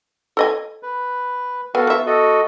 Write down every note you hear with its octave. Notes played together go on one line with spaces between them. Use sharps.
A4 D#5 G#5
B4
B3 F#4 A4 F5 G#5
B3 E5
F#4 A4 D#5